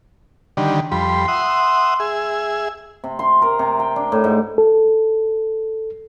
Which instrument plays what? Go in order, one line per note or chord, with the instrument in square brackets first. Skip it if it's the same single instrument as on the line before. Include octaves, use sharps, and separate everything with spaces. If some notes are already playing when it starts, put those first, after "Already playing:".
[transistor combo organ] D3 D#3 G3
[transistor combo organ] F2 G3 B5 [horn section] C6
[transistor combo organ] E5 F#5 D#6
G#4 E5
[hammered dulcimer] C3
C6
A#4
C3
G5
D4
A2
G#2
[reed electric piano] A4